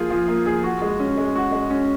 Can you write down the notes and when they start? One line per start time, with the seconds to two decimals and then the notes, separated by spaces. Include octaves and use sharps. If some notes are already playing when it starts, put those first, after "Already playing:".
Already playing: F3 A#3 F4 G#4
0.10 F3
0.28 A#3
0.46 G#4
0.63 F#4
0.82 G#3
1.00 C#4
1.18 G#3
1.35 F#4
1.52 G#3
1.70 C#4